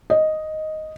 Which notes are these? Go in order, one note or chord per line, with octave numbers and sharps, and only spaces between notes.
D#5